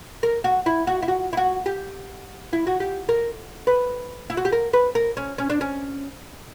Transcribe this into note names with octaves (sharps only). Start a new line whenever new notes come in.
A#4
F#4
E4
F#4
E4
F#4
E4
F#4
G4
E4
F#4
G4
A#4
B4
E4
F#4
G4
A#4
B4
A#4
C#4
C#4
D4
C#4